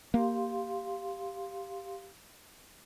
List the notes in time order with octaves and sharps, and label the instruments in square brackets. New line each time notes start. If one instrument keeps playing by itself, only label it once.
[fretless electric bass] A#3 [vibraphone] G4 F5 C6